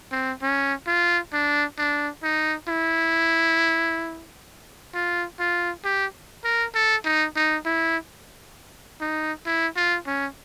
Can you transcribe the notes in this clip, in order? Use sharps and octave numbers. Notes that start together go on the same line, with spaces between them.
C4
C#4
F4
D4
D4
D#4
E4
F4
F4
G4
A#4
A4
D#4
D#4
E4
D#4
E4
F4
C#4